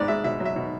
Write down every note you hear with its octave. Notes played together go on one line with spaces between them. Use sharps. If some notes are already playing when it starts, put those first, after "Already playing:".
Already playing: G#2 B3 D5
G#3 E5
B2 E5
F#3
E5
B2